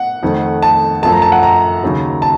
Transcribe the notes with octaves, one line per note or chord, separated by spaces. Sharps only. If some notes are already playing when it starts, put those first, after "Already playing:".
Already playing: F#5
F2 D#3 A3
A5
F#2 F3 A3 A5
A#5
A5
F#5
A#5
D#2 C#3 F#3
A5